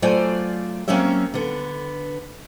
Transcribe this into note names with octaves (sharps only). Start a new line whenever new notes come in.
F#3 A3 F4 C5 D5 G#5
F#3 A#3 C4 C#4 C#5 E5
D3 B3